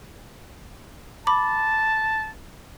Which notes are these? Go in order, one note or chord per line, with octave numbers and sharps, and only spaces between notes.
A5 B5 D6